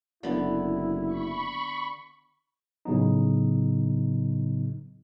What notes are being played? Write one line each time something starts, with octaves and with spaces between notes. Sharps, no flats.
F#1 D3 B3 E4
B5 C#6
A2 C#3 F#3 B3 D#4